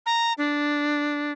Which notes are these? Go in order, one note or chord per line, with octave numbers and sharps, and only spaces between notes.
A#5
D4